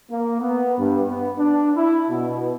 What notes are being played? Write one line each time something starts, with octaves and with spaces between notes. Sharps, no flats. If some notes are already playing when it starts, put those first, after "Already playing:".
A#3
B3
G2
B3
D4
E4
B2